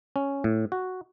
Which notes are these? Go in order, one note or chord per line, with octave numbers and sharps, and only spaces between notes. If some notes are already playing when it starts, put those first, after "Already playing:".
C#4
A2
F#4